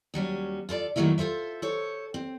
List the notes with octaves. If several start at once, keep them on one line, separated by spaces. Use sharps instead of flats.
D#2 F#3 G3 C#4
F4 A4 A#4 D5
F2 D#3 F#3 A3 A#3 E4
F4 A4 C5 E5
A4 C5 C#5
C4